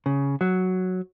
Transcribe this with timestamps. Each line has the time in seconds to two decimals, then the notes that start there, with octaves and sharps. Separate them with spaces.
0.06 C#3
0.41 F#3